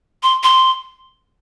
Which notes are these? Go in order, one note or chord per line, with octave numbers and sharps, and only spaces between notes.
C6
C6